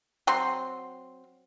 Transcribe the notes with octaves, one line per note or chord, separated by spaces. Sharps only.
F#3 C4 C6